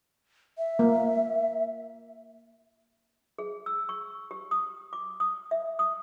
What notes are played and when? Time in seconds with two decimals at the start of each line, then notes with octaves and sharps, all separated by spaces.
0.58 E5
0.79 A#3
3.38 G#4
3.66 E6
3.89 C#6
4.31 G4
4.51 D#6
4.93 D6
5.20 D#6
5.51 E5
5.79 D#6